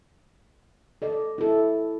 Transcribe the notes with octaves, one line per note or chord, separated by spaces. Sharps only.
A4 D5 D#5
E4 A4